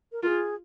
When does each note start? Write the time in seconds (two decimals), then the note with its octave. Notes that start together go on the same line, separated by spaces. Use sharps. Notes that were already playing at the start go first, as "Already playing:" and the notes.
0.12 A#4
0.23 F4 G#4 A#4